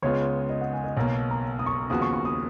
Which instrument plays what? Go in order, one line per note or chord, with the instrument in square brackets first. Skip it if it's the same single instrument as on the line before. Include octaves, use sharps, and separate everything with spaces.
[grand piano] C#2 C#3 G#3 B3 F4 [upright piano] C#5
[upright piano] D#5
F#5
G#5
D#5
[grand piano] B1 B2 A#3 [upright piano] C#5
[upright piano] A#5
D#6
C#6
[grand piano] D#2 C#3 F3 B3 F#4 [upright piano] D#6
[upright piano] C#6
C#6
D#6